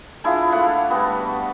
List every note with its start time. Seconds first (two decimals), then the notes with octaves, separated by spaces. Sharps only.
0.24 G#3 D4 E4 F4
0.52 A3 D5 F5 F#5
0.90 G3 B3 F#4